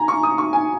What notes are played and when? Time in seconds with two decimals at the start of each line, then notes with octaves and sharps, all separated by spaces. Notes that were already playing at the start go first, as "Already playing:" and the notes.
Already playing: G#5 A#5
0.08 C#6
0.23 D#6
0.38 C#6
0.53 G#5